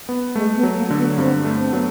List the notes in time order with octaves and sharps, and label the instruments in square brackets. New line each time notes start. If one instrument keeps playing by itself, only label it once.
[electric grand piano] B3
[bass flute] G#3 [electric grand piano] A3
[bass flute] B3
[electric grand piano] F#3
[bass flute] A#3
[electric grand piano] D3
[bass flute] B3
[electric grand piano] G2 [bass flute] C4
[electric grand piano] A3
[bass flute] C4
[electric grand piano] F#3 [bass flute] B3